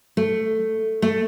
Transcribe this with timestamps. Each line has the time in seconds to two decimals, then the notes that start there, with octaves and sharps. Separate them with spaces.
0.17 A3
1.02 A3